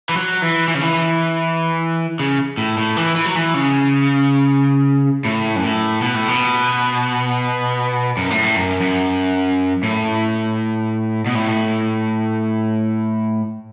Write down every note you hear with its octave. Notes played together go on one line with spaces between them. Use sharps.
E3
F#3
E3
E3
C#3
E3
C#3
A2
A2
E3
E3
F#3
E3
C#3
A2
F#2
A2
B2
A2
B2
F#2
A2
F#2
F#2
A2
B2
A2